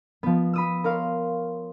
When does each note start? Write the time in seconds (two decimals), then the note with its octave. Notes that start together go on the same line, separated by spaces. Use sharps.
0.23 F3 B3
0.53 B5 D#6 E6
0.84 A#4 C#5 F5 C6